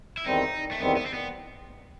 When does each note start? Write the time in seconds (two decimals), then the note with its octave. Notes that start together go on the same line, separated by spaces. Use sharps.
0.17 E4
0.26 E2 D#3 G3 C4 D#4
0.71 A3
0.79 E2 D#3 G3 B3 C4
0.97 B3
1.06 C4
1.14 B3